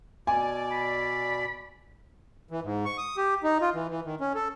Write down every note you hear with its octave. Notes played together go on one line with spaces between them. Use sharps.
B2 D5 G#5
B5
E3
G#2
C#6
D#6
G4
D#4
F4
E3
E3
D#3
C#4
A4